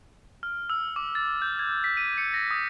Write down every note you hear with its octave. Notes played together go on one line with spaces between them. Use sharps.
F6
E6
D6
A6
G6
G#6
B6
D#7
C#7
A#6
D#6